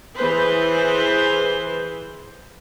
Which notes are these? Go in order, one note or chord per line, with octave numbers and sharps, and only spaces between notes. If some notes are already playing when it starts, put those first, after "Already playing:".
E3 G#4 B4 C5